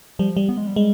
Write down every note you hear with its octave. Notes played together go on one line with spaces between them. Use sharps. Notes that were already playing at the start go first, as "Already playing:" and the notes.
F3 G3
G3
B3
G#3
G3
G#3